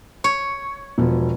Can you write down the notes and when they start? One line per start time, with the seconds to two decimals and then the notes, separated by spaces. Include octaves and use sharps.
0.24 C#5
0.98 E1 B2 F3